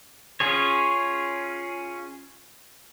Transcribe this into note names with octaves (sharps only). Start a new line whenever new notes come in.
C#4 F4 G#4 C#5